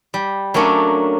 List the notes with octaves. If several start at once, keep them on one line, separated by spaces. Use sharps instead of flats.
G3
F#3 A3 A#3 C#4 D4